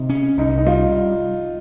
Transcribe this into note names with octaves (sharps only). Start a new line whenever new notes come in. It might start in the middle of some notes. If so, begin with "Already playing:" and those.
Already playing: C3 D#4
C#4
C2 D#4
D#4
G3 F4